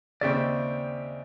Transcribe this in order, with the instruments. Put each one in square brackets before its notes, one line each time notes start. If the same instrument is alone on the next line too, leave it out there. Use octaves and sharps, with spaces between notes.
[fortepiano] D#2 C#3 C4 [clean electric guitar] D5 E5 G5